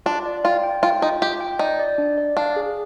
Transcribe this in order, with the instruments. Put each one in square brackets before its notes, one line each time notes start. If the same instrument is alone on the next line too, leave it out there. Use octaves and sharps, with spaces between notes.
[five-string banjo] D4 [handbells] F4
[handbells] D5
[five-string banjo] F4 [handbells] G5
[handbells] G5
[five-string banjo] F4 [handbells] G5
[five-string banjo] D#4 [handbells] F4
[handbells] F4 [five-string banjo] G4
[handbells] G5
[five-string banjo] D#4 [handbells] D5
[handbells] D5
D4
D5
[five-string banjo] D4 [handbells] F5
[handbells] G#4